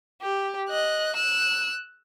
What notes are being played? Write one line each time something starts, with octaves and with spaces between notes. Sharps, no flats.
G4
D#5 F#6
E6 F#6